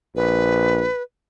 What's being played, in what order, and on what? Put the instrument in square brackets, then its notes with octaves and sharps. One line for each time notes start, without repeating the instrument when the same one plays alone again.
[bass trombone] A#1 [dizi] B4